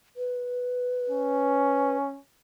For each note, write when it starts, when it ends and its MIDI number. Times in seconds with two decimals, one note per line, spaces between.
0.17 1.97 71
1.10 2.19 61